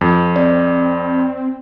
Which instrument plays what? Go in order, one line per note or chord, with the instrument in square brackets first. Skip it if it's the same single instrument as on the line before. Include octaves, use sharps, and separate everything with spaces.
[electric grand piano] F2
[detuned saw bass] C4 [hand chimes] D5